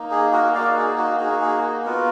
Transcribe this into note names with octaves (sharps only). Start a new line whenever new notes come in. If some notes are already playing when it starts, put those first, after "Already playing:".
Already playing: A#3 D#4
G#4
F#4 A#4
A#3 D#4 F#4 D5 F5
G#4
F#4
A#3 D#4 F#4 G#4
G#4
F#4
B3 F4 F#4 A#4